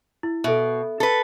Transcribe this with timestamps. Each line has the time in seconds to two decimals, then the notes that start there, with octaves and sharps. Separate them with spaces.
0.23 E4
0.44 B2 A4 E5
1.00 A4 B4